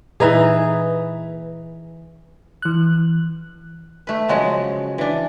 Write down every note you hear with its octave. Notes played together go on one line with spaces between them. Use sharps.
A#2 E3 D#4 G#4 B4
E3 F#6
A3 B4
C#3 F3 F#3 G#3 B3
E3 D4